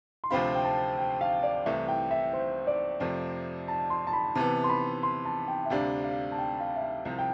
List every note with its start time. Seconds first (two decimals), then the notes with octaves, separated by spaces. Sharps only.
0.24 C6
0.30 D2 C3 F3 C4 F4 B5
0.55 G5
0.64 A5
0.98 G5
1.21 F5
1.43 D5
1.66 C2 C3 E3 A3 E5
1.88 G5
2.11 E5
2.33 C5
2.67 D5
3.00 F2 C3 F3 A3 C4
3.68 A5
3.90 C6
4.07 A5
4.13 B5
4.35 C3 E3 B3 A5
4.64 C6
4.69 B5
5.03 C6
5.25 A5
5.48 G5
5.65 E5
5.70 D2 C3 G3 D4 F5
6.04 F5
6.32 A5
6.38 G5
6.60 F5
6.76 E5
6.83 F5
7.05 C2 C3 F3
7.18 G5